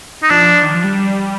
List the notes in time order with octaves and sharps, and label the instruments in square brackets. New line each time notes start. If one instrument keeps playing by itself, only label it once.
[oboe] D#4
[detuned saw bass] F3 [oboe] D4
[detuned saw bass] D#3
F3
G3